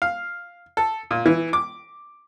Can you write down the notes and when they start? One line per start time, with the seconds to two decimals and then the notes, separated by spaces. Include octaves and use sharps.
0.02 F5
0.77 A4
1.11 A#2
1.26 E3
1.53 D6